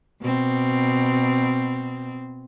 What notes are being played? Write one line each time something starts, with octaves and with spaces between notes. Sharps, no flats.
B2 C4